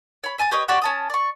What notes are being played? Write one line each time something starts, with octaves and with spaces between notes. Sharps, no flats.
C#5 B5
E5 G#5 A5 D#6
G4 B4 C#5 D#5
F#4 G4 C#5 D5
C#4 A5 D#6
D5 C#6